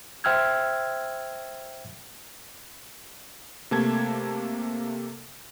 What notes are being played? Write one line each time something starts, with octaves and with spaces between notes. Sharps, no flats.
C5 E5 G5 E6 F6 G#6
C3 A3 A#3 A5 G#6